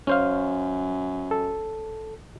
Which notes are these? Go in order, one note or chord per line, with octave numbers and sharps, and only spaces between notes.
F#2 C#4 C5 F5
A4